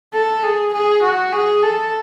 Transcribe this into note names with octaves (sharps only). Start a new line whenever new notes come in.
A4
G#4
G#4
F#4
G#4
A4